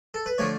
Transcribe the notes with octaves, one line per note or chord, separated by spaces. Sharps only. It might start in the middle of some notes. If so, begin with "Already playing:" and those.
A4
B4
D3 F3 A3 C#5